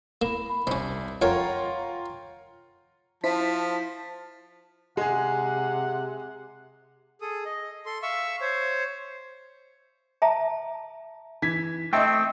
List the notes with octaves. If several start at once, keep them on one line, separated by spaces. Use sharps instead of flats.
A#3 E4 B5 E7
B5
C2 C4 C#4
F2 F4 A#4 C#5 F#5 G5 A#5
F3 E4 C5 A5 B6
C3 G#3 G#4 F#5
G#4 A4 D#6
D#5
A4 C6
E5 F5 C#6 E6
C5 C#5
E5 A5 A#5
E3 G#6 B6
A3 C4 D#5 E5 G5